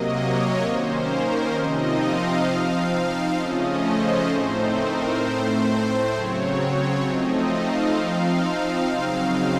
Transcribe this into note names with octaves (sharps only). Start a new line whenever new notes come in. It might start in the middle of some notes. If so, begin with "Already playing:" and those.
Already playing: C3 F#3 A#3 D#5
C#5
D#3 A#3 C#4 C5
A#4
C5
C3 F3 C4 D#4 D#5
F5
F3 C4 D#4
C#3 F3 A3 C#4 D#5
C5
A2 A3 C4 D#4 C5
A#4
A2 A3 C4 C5
C5
C#3 F#3 C4 C#5
C#5
F3 A3 C4 D#4 D#5
F5
F3 C4 D#4 F5
C#3 F#3 C4 D#4